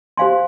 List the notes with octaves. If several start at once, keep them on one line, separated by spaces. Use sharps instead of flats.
G4 C5 F5 G#5 C6